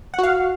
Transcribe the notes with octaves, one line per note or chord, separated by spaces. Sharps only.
F#4 F5 F#5